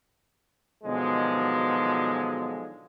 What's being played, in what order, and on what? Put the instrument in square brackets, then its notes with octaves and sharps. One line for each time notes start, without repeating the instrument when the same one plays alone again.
[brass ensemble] B2 D3 D#3 F3 F#3 G#3